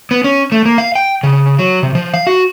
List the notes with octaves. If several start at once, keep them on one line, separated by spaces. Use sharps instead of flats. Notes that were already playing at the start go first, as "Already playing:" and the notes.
B3
C#4
A3
A#3
F5
G5
C#3
F#3
C3
F3
F5
F#4